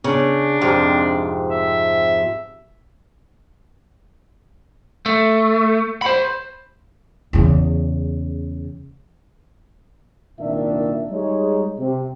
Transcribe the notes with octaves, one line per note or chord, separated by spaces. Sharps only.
C#3 D4
F2 G#2 C3
E5
A3
C5 B5
E2 C#3
C2 A#2 D#3 A#3 D4 E5
G3 G#3 D#4 C#5
C3